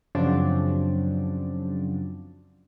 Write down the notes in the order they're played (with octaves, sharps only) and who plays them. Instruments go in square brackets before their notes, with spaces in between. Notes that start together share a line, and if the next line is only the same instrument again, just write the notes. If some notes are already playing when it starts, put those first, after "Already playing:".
[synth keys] F#2 C#3 F3 F#3 C4 D4